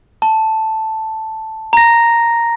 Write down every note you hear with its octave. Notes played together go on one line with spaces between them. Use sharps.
A5
A#5 A#6